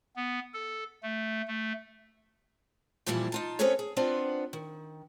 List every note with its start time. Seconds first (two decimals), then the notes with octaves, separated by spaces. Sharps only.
0.16 B3
0.53 A4
1.03 A3
1.48 A3
3.06 F2 A#2 E3 F3 G3 E4
3.32 D#4 F4 A5
3.59 C4 C#4 G#4 A4 B4 C#5
3.79 G#4
3.96 B3 C4 D4 F4
4.53 D#3